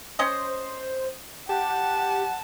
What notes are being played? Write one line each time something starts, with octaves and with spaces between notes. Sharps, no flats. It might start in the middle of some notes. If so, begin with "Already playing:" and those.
C#4 C5 D#5
G4 F#5 A5